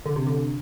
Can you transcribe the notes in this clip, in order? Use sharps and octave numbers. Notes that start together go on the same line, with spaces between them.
D3
C3
D3